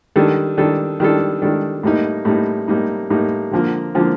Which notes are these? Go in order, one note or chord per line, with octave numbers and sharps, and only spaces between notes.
D#3 G3 D4 A4
D#3 G3 D4 A4
D#3 G3 D4 A4
D#3 G3 D4 A4
A2 G3 A#3 D#4
A2 G3 A#3 D#4
A2 G3 A#3 D#4
A2 G3 A#3 D#4
D3 F3 A#3
D3 F3 A#3